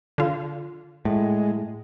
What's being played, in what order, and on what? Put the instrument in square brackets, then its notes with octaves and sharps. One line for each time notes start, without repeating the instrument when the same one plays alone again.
[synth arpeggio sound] D3 F4
[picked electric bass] A2 [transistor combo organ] G#3